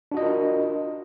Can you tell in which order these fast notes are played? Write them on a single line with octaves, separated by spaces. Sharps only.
D4 F#4 D#5 F4 A#4